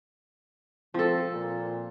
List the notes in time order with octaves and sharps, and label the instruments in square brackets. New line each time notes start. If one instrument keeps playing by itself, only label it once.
[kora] F3 A4 [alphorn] C4
[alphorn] A#2